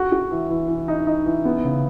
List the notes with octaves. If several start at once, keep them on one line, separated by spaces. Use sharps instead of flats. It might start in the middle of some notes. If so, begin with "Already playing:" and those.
Already playing: F#4
F#4
E3
E3
E3
D#4
D#4
E3
B3
C#3